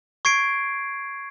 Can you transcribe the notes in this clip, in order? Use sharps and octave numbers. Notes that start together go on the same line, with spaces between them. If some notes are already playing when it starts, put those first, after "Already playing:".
C#6 G#6 C7 D7